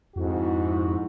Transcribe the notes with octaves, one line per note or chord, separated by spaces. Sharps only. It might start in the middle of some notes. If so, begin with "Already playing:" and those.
F2 G#2 E4 F#4